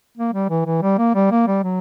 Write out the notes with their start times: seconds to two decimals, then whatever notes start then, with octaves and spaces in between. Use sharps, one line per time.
0.17 A#3
0.34 G3
0.50 E3
0.66 E3
0.82 G3
0.98 A#3
1.15 G3
1.31 A#3
1.47 G3
1.63 F#3